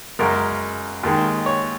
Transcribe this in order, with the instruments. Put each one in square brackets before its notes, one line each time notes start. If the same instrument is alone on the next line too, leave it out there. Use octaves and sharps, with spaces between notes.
[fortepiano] F#2 C#3 G#3 A#4
D#2 D#3 G#3
C#5